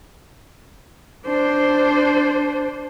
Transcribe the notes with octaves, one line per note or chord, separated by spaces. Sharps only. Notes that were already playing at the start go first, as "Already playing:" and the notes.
D4 C5